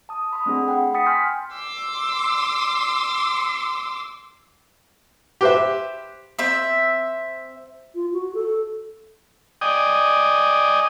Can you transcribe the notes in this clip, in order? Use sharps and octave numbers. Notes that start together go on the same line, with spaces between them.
A5 D#6
B5 C6 D#6
A3 C4 D4 G#4 F#5
F#5 G5 B5
G5 B5 D#6 A6 B6 C#7
G#5 C6 F6 G6 B6
C6 D6 E6
G4 B4 C5 E5
C4 E5
F4
F#4
A4
D5 D#5 G5 G#5 D#6